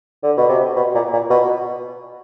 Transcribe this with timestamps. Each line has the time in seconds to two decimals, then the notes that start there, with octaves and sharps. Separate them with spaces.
0.23 D3
0.37 B2
0.49 C3
0.76 B2
0.94 A#2
1.13 A#2
1.30 B2